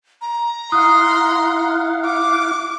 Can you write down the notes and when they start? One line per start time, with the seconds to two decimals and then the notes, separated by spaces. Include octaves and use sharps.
0.22 A#5
0.72 E4 F5 F#5 C6 D#6
2.05 D6